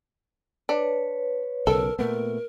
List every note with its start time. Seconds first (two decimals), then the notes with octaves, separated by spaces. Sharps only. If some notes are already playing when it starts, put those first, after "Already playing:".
0.69 D4 B4 C#5
1.67 B1 C#3 A4 A#4
1.99 A#2 A3 B3 A#4